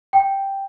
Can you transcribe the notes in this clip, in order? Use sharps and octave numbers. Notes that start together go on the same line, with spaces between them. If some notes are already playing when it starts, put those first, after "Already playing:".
G5